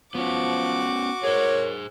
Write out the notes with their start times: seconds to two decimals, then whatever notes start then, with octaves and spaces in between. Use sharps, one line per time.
0.15 F3 B3 C#4 F#4 D6
1.24 G#4 A#4 C5 C#5